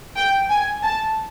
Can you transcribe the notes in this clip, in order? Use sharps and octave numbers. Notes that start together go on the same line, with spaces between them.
G5
G#5
A5